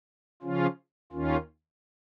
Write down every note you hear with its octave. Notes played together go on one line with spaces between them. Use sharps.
C#3 F3 C#4 F4
D#2 D#3 C#4 F4